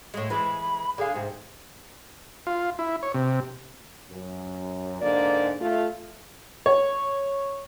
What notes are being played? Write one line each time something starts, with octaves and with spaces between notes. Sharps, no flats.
A2 G#3
E3 G#3 B5
D3 G#4 F5
G#2 C3
F4
E4
C#5
C3
F#2
G#2 D3 A#3 D5
A3 F4
C#5